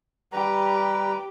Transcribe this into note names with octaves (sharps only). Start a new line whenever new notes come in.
G3 G4 B4 A#5